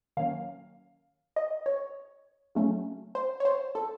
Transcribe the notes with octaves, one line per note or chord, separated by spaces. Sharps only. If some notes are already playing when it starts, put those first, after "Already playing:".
D#3 F#3 A#3 C#4 F5
D#5
C#5
C#3 F#3 A3 C#4
C5
C#5
C5
A4